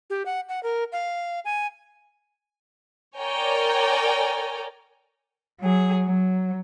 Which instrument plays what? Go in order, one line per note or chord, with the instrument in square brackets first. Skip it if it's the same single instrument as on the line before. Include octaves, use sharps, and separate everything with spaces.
[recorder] G4
F#5
F#5
A#4
F5
G#5
[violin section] A#4 C#5 D5 G5 G#5 A#5
[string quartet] F#3 G#4
F#3